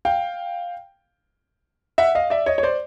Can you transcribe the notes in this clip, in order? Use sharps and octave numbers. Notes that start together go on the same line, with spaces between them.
F5 G5
E5 F#5
D#5 F5
D5 E5
C#5 D#5
C#5
C5 D5